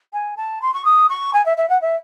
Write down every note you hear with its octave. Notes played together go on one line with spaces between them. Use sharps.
G#5
A5
C6
C#6
D#6
C#6
G#5
E5
E5
F#5
E5